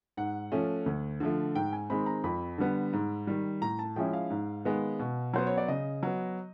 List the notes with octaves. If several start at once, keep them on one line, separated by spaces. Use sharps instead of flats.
G#2 F#5
F3 A3 C#4
D2
D3 F3 A3
G#2 G5
G#5
D#3 G#3 C4 B5
A#5
F2 B5
D3 G3 B3
G#2
D#3 G3
A2 A#5
A5
F3 G#3 C#4 E4 G5
F5
G#2
D#3 G#3 B3
B2
F#3 B3 C5
C#5
D5
C#3 D#5
F#3 B3